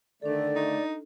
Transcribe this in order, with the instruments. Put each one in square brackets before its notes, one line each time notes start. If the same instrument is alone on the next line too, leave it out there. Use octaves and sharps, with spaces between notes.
[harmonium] D3 D#3 A3 [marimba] D4 A4 [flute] D5
[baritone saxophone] D#4